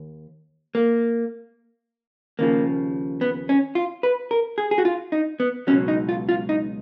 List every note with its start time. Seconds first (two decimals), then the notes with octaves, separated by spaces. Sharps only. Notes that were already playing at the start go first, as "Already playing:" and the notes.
Already playing: D#2
0.75 A#3
2.39 D#2 C#3 F3 A#3
3.21 B3
3.49 C#4
3.75 F4
4.03 B4
4.31 A#4
4.58 G#4
4.71 G#4
4.78 F#4
4.85 F4
5.12 D#4
5.40 B3
5.67 C#2 B2 F#3 C#4
5.88 D#4
6.09 F4
6.29 F4
6.49 D#4